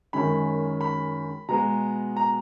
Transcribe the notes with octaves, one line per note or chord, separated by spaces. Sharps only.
F#2 D#3 G#3 C#4 B5
B5
B2 G#3 B3 A#5
A#5